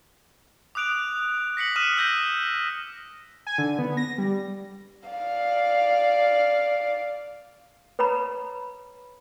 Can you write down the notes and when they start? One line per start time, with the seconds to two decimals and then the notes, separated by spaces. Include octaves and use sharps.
0.75 D6 D#6 F#6 D7 F7
1.57 A#6 B6 C#7 F#7
1.76 D#6 F6 B6 D#7 E7
1.97 E6 G6 A#6
3.47 G#5
3.58 D3
3.79 B3
3.97 A#6
4.18 G3
5.09 D5 F5
7.99 B4 C#5 A#5 B5